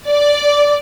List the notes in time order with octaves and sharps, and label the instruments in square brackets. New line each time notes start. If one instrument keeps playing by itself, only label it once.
[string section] D5